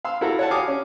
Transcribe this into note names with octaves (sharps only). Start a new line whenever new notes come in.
F5 C6 E6
E4 F#4 A4 F5 A#5
C#5 F#5 A5
F#4 G4 F5 G#5 D6 D#6
C#4